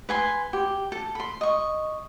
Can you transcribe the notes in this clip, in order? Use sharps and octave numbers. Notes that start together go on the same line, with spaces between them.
B4 G#5 C6
G4
A4
B5 C6
D#5 C#6